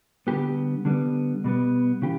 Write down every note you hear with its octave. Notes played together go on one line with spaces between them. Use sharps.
D3 G3 B3 G4
D3 G3 B3
B2 G3 B3
C#3 E3 G4